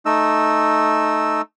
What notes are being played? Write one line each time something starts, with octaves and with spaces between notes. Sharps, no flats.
A3 D#4 E6